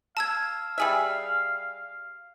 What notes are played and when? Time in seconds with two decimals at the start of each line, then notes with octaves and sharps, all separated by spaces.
0.17 F5 A5 E6 G#6
0.78 G3 G#4 E5